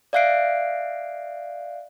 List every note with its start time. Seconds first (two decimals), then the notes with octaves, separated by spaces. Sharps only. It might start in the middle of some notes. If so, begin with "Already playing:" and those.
0.13 D5 E5 F5 F#6 C7 D7